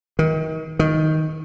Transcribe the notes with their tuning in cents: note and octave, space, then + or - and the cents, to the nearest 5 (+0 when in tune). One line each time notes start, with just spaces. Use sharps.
D#3 +30
D#3 +10